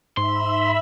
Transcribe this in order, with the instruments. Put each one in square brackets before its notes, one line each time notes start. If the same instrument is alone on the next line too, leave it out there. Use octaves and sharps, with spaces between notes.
[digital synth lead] G#2 [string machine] E5 B5 [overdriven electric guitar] C6